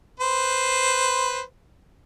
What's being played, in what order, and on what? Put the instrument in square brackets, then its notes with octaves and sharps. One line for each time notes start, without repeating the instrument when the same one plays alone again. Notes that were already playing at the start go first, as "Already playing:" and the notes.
[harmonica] B4 C5